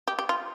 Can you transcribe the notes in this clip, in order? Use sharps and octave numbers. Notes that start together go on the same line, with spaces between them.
G4
G4
F4